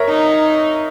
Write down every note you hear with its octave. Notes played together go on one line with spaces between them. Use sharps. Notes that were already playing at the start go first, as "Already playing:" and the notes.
Already playing: A#4 C#5 E5 A#5
D#4